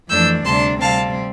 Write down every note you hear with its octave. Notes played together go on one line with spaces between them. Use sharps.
F2 E3 A3 D4 E6 G6
D2 C3 G3 D4 A5 C6
C3 G3 C4 F5 A5